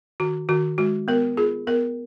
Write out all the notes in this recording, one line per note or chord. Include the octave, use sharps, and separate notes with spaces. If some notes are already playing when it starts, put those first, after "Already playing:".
D#3 F#4
D#3 F#4
G#3 F#4
B3 A#4
F4 G#4
B3 A#4